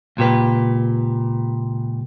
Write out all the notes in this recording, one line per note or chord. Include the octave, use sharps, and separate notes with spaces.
C#2 A#2 G4 B4